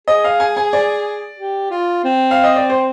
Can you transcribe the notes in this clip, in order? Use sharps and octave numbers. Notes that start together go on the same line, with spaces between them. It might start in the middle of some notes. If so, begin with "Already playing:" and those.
G#4 D#5
F5
G#5
G#5
D5
G4
F4
C4
F5
D#5
D5
C5